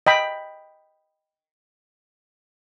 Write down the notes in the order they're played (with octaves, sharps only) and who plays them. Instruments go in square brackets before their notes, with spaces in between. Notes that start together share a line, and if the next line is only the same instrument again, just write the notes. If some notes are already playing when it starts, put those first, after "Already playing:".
[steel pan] D#5 G5 B5